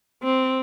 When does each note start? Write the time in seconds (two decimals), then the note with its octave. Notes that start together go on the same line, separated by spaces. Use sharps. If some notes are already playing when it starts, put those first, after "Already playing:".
0.23 C4